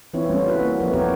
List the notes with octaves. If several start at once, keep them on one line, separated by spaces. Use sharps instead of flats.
E3 B3 C4 E4 F4 C#5
G3 A3 C#4 F4
F#4 B4
A#3
F3 A3 B3
C4 F#4 G4 A#4 C#5